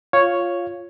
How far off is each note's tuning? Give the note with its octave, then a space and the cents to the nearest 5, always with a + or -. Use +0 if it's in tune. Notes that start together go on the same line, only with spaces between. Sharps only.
F4 +0 C#5 +0 F5 +0